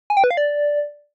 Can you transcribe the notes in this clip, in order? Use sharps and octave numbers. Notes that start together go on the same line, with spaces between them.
G#5
G5
B4
F5
D5